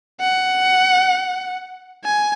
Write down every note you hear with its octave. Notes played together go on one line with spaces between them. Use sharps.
F#5
G#5